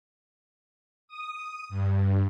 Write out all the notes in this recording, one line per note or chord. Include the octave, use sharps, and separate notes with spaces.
D#6
G2